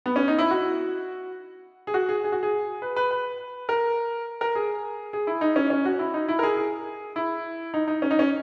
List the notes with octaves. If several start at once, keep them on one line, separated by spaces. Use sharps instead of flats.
B3
C#4
D#4
E4
F#4
G#4
F#4
G#4
G#4
F#4
G#4
B4
B4
B4
A#4
A#4
G#4
G#4
E4
D#4
C#4
C#4
F#4
E4
D#4
E4
A#4
G#4
G#4
E4
D#4
D#4
C#4
D#4
C#4